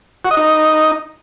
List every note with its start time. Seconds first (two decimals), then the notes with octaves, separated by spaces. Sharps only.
0.25 F#4
0.31 D#5
0.37 D#4